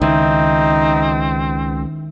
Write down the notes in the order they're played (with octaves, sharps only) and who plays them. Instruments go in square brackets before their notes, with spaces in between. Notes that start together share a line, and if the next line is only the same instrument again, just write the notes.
[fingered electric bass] C#2 [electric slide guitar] D#3 E4 [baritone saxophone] C4 [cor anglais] D#4